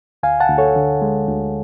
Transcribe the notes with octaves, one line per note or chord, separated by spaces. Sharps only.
D2 F5 G#5
F#5 A5
D2
A4 C#5
D3
G#3
D2